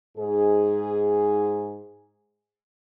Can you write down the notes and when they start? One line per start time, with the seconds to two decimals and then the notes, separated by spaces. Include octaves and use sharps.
0.18 G#2 G#4